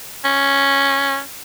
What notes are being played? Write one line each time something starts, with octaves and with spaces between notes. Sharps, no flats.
C#4